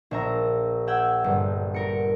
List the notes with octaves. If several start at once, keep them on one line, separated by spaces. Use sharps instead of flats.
A#1 E5 A#5
E5 F#5 G5 E6 G#6
G1
A#4 C#7